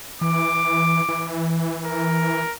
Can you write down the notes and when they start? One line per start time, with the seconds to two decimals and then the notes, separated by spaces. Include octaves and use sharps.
0.21 E3 D6
1.08 E3
1.85 A#4